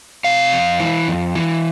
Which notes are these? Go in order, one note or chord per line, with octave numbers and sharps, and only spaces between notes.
C3 F5
F2
E3
F2
E3